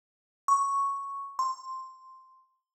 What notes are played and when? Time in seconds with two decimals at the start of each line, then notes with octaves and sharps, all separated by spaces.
0.48 C#6
1.39 C6